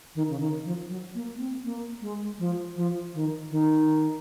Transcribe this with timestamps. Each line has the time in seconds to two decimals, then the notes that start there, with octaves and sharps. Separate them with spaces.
0.15 D#3
0.29 C#3
0.40 D#3
0.65 F3
0.89 F#3
1.15 A#3
1.35 A#3
1.40 C4
1.64 A#3
2.01 G#3
2.39 F3
2.76 F3
3.14 D#3
3.51 D#3